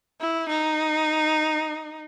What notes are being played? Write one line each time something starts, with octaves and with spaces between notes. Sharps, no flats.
E4
D#4